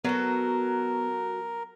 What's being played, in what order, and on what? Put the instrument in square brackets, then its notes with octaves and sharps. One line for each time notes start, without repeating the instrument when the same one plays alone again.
[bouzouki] F#3 F#4 A4 [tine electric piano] B3 [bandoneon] A#4